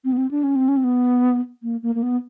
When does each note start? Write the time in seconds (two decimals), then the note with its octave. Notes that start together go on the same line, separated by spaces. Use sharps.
0.04 C4
0.12 B3
0.17 C4
0.31 D4
0.43 C#4
0.56 C4
0.68 C#4
0.77 C4
0.84 B3
1.63 A#3
1.83 A#3
1.95 A#3
2.03 B3